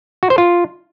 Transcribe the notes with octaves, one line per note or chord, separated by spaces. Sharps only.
F#4
C5
F4